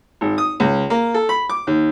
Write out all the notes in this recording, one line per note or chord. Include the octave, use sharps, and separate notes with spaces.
G#1
D#6
C#2
A#3
A4
B5
D6
D#2